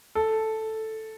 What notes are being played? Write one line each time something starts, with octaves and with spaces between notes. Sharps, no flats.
A4